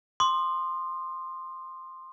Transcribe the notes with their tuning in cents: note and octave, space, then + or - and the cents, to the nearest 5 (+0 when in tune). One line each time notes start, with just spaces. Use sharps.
C6 +5 D#6 -40